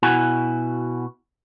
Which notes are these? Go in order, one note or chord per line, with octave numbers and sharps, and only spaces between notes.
B2 E4 F#4 G#5